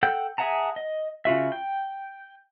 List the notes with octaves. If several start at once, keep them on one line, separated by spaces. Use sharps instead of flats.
A4 F#5 G5 G6
G#4 E5 F#5 A5 A#5
D#5
C#3 F4 F#4 E5
G5